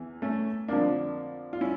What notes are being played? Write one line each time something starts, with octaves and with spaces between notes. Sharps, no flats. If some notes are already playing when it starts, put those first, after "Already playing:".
Already playing: E2 E3
A3 C#4
F2 D3 F3 A#3 D4
F4
C#4 E4